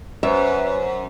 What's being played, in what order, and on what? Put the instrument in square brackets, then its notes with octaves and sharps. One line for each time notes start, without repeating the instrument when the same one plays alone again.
[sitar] F#2 [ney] B4 [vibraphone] C5 [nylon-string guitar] E5